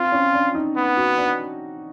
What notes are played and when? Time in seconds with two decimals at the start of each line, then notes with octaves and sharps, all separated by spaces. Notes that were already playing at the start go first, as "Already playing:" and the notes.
Already playing: C4 F4
0.12 C#4
0.34 D4
0.55 D#4
0.77 B3
0.97 F#4
1.18 D4